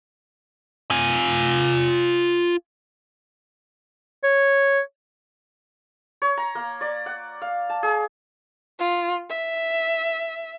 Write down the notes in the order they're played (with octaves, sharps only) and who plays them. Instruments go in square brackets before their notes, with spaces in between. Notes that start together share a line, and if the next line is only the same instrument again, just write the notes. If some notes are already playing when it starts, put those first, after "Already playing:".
[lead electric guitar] F4 G#5
[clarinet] C#5
[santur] C#5
A#5
A#3
D5
F#5
F5
A5
G#4
[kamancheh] F4
E5